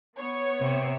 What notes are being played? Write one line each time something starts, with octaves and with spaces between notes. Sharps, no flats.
B3 C#5
C3